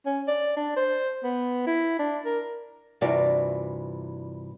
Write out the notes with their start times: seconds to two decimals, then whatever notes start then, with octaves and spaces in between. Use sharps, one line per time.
0.06 C#4
0.28 D5
0.57 D4
0.76 C5
1.23 B3
1.66 E4
1.99 D4
2.25 A#4
3.01 G2 C3 E3 F4 F#4 D5